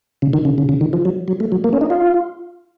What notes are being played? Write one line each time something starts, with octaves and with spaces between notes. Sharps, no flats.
C#3
D#3
C#3
C#3
C#3
D#3
F3
F#3
F#3
A3
F#3
A#3
C#4
D#4
F4